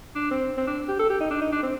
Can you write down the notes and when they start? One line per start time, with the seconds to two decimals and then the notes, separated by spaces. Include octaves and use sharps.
0.15 D4
0.31 C4
0.57 C4
0.67 D4
0.88 G4
0.99 A4
1.10 G4
1.21 D#4
1.31 D4
1.41 D#4
1.52 D4
1.63 C4